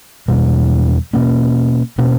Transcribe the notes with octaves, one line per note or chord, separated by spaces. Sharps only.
E2 B2 G3
B2 A#3 C#4
B2 A#3 C#4